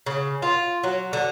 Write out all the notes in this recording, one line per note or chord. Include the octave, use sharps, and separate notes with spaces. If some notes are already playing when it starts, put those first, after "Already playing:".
C#3
F4
F#3
D3